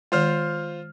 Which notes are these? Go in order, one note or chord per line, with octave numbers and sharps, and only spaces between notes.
D#3 G#3 F4 C5 F6